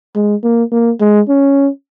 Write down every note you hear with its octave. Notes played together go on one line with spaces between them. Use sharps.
G#3
A#3
A#3
G#3
C#4